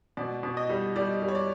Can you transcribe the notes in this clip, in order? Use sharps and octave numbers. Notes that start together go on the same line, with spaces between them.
B2 D5
B2
D#5
G3
G3 D5
G3
C#5
D5